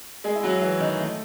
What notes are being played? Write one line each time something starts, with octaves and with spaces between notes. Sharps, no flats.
G#3 G#4
E4
F#3 F#4
E3 E4
D#3 D#4
A3